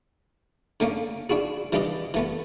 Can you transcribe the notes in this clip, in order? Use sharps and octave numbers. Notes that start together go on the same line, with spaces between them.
D3 A3 A#3 C#4
D4 E4 F#4 G#4
E3 G3 D4 G4 B4 D#5
E3 A3 B3